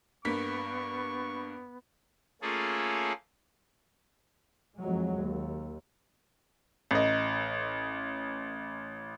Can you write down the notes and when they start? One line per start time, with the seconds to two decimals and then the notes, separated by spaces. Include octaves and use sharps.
0.25 G2 A#3 B3 C#6 B6
2.42 A3 A#3 C#4 F4 G#4 A4
4.78 F2 F#3 G#3
5.17 D#2
6.91 A1 D#5